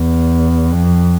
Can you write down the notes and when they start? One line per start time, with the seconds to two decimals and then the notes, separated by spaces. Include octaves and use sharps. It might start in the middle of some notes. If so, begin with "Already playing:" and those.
Already playing: E2
0.71 F2